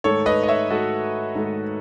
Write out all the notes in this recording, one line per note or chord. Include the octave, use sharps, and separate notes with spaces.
G#2 D#3 A3 A4 C#5
B4 D#5
D#5
C#5 E5
G#2 D#3 A3 F#4 A4
G#2 D#3 A3